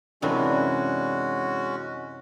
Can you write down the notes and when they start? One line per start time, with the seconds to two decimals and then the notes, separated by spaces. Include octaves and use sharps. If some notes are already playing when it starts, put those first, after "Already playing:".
0.22 F#2 C3 E3 G#3 C#4 D4 F#4 B4